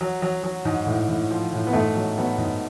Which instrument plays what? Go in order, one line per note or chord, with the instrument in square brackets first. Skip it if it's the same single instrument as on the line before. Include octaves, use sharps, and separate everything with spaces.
[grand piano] F#3
F#3
F#3
G#2
A2
A2
F3
A2
B3
G#2 A3
F#3
F#3 B3
G#2